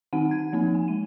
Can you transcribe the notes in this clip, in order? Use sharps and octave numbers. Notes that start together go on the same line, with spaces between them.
D#3 C4 D#4 F#5 D#7
G#6
F3 A#3 C4 D#4
G#5
G#3 D#7